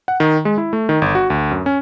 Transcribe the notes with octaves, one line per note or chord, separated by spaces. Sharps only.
F#5
D#3
G#3
E4
A3
D#3
G1
F#4
D2
F#2
C#4